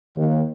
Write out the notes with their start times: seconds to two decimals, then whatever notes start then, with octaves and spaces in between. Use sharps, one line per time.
0.16 D#2